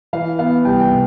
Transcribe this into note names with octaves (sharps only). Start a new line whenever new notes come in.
E3 F5
B3 F5
C2 G5
G5
C3